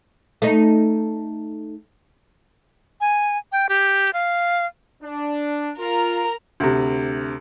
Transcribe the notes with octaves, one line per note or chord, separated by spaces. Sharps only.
A3 D#4
G#5
G5
G4
F5
D4
F4 A#4 A#5
D2 C3